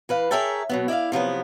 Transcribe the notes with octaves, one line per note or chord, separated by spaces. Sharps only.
E3 B4 F5
G#4 A#4 C#5 E5 G5 A5
B2 F#3 B3
E4 D5 D#5 F5
C3 F3 F#3 B3